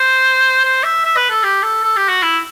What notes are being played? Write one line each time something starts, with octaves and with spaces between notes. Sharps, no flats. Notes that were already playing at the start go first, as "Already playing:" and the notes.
Already playing: C5
C5
E5
E5
B4
A4
G4
A4
A4
G4
F#4
E4